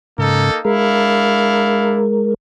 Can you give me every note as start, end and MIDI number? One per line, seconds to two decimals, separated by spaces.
0.18 0.51 44
0.18 0.51 49
0.18 0.59 58
0.18 0.59 63
0.18 0.59 69
0.65 2.34 56
0.65 2.05 62
0.65 2.05 64
0.65 2.34 70
0.65 2.05 77